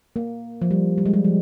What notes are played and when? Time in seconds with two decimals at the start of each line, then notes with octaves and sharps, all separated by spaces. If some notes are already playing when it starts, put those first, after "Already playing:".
0.16 A#3
0.62 F3
0.71 G3
0.98 G3
1.06 G#3
1.13 G3
1.24 F3